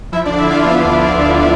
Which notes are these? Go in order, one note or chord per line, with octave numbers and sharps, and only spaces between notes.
F3 E4 E5
D4 D5
D3
E4 E5
D3 F4 F5
B3 F4 F5
D2
F3
F3
B3